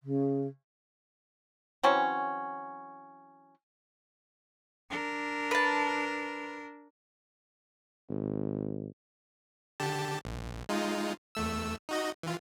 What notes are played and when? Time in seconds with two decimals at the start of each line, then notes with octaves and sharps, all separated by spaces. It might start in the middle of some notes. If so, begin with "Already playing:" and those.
0.03 C#3
1.83 E3 F#3 C4 C#4
4.90 D4 A#4
5.51 B4 A5
8.10 G#1
9.80 D3 G4 A5
10.25 A#1
10.69 G#3 D#4 F4
11.35 E2 A3 E6
11.89 D#4 F#4 D#5
12.23 E3 F4